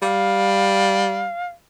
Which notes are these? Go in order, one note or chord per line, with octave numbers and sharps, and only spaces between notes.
G3 F5